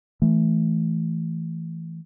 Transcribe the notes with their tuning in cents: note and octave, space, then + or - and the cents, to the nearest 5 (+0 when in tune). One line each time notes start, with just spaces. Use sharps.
E3 +0 A3 +0